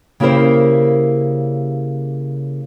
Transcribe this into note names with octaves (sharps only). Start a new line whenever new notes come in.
C#3 A#3 E4 G4 A#4 C5